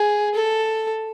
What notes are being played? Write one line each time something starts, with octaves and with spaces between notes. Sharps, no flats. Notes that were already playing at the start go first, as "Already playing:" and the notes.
Already playing: G#4
A4